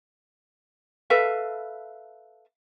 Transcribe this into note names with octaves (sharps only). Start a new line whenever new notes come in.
A4 B4 E5 F5